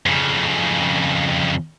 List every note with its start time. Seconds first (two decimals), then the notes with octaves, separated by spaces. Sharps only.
0.06 F2 C#3